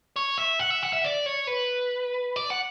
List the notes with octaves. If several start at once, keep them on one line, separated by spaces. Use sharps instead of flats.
C#5
E5
F#5
E5
F#5
E5
D5
C#5
B4
D5
F#5